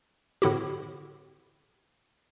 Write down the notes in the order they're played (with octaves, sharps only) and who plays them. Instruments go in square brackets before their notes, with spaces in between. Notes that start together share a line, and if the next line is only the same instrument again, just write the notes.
[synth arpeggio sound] A2 D3 C4 E4 F#4 G4